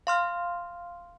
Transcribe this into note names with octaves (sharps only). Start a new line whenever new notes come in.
F5 C6 F6